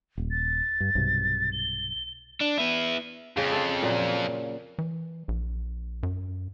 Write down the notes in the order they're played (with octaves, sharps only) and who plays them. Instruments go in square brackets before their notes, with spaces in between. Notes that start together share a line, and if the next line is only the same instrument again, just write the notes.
[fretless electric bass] D#1
[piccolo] A6
[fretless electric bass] G2
B1 G2 C3
[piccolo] G7
[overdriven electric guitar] D4
B3 E4
[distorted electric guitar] F2 [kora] C#3
[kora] A4 F5
A#2 F#3
[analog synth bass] E3
A#1
F#2